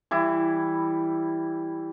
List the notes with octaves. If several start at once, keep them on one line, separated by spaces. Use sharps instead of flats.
E3 G3 E4